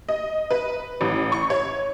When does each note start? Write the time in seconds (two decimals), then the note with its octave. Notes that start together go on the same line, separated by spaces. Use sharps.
0.09 D#5
0.51 B4
1.01 A1
1.32 C#6
1.50 C#5